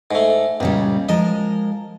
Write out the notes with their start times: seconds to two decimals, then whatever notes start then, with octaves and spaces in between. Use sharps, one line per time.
0.11 G#2 A3
0.60 C#2 A#2 C#3 G3
1.09 F3 G#3 A#4 D#5